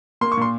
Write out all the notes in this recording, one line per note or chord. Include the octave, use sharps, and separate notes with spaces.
A#3 C6
C#6
A#2 C6